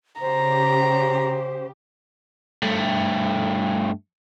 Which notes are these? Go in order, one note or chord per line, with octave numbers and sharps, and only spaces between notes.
C#3 G4 C5 A#5
G2 A3